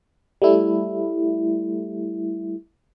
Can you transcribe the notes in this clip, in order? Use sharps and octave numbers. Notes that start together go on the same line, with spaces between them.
G3 A3 E4